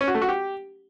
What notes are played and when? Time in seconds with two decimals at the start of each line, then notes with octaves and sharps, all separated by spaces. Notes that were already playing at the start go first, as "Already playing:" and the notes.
0.01 C#4
0.08 F#4
0.15 A3
0.22 F#4
0.29 G4